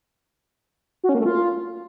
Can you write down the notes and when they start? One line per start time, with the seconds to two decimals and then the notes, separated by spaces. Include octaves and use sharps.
1.04 F#4
1.09 C#4
1.15 A#3
1.20 A3
1.26 F4